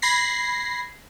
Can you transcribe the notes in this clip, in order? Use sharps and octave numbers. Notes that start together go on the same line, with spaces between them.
B5 G#6 A#6 C7